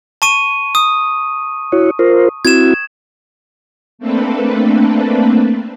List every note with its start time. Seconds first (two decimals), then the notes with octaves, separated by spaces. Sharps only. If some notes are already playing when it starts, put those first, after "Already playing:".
0.22 A5 C#6 D#7
0.75 D#6
1.72 E4 F#4 C#5
1.99 F4 A#4 C5
2.45 C4 E4 F#4 G#6 E7
3.99 A3 A#3 C4 D4 A4 B4